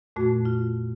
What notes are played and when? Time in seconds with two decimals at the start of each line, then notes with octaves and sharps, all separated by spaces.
0.16 F2 A#2 A3 F#4
0.45 F4